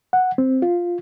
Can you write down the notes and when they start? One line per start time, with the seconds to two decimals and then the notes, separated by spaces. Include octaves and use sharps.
0.13 F#5
0.38 C4
0.62 F4